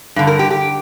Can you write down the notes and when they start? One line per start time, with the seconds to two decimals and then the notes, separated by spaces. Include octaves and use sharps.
0.16 G2 D3
0.27 A#4
0.39 G4
0.51 G4